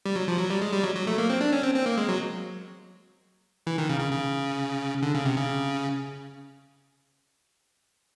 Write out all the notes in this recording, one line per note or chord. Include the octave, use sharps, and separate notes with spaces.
G3
F#3
F3
F#3
G3
G#3
G3
F#3
F#3
A3
A#3
C4
D4
C#4
C4
C4
A#3
G#3
F#3
E3
D#3
C#3
C#3
C#3
D3
C#3
C3
C#3